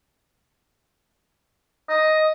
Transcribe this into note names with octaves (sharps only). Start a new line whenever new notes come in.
D#5